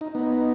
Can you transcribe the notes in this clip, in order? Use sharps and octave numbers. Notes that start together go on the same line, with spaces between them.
D#4
B3 D#4